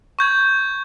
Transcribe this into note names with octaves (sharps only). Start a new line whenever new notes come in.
C#6 G6 G#6